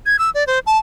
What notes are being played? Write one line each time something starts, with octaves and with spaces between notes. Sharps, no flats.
G#6
E6
D5
C5
A5